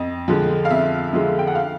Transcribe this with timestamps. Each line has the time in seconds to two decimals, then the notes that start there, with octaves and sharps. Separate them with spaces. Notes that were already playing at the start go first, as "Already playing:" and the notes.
Already playing: F2 D#5
0.28 D3 F3 G#3
0.65 F5
0.70 F2 E5
1.13 D3 F3 G#3
1.39 G5
1.47 F#5
1.55 F5